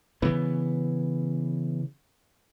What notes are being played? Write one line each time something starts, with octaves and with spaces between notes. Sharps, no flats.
C#3 E3 B3